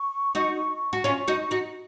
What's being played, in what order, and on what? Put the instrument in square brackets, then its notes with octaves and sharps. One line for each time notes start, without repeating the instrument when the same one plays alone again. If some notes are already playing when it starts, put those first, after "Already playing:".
Already playing: [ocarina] C#6
[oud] D#4 F#4
F#4
C#4 F4
D#4 F#4
D#4 F#4